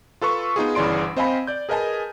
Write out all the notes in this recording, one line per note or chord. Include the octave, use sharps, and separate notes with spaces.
F4 A4 B4 C#6
B3 D#4 F4 G#4
G1 C#3 E3 D5 C6 D7
C4 C5 D#5 F5 G#5 B5
D5 G6
G#4 A#4 B4 D#5 G#5 A5